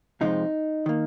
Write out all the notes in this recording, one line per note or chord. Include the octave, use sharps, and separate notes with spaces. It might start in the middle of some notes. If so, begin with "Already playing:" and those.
C3 F3 G#3 C4 D#4
D#3 A#3